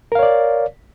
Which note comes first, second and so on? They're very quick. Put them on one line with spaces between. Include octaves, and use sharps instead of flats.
A#4 F5 C#5 D5